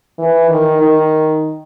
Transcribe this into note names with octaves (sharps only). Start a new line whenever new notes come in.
E3
D#3
D#3